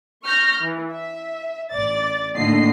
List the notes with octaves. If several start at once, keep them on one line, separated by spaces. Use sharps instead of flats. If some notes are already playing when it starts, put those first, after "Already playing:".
C#6 F6 G6 A#6
E3
E5
A1 D5 A6
A1 D#2 A2 D3 D#5 C7